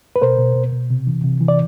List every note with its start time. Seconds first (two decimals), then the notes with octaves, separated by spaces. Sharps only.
0.16 B4
0.22 B2 A#4 C5
0.39 B2
0.55 B2
0.72 B2
0.90 C3
1.07 E3
1.24 C3
1.40 E3
1.48 D5